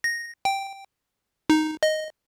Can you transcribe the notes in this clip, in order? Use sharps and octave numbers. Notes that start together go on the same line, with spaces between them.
A#6
G5
D#4
D#5